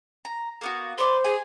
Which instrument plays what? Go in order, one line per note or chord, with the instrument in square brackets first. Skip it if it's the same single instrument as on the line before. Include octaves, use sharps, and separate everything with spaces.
[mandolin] A#5
A#3 B3 F#4
[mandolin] B4 D5 [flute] C5 [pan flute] C6
[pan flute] G#4 [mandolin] G#5